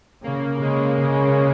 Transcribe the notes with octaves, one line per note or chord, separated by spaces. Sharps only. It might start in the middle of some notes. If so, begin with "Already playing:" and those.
C#3 A#3
C#3 G#3
C#3